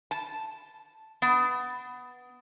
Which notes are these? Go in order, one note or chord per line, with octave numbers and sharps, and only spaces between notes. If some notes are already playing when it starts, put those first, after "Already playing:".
A5
B3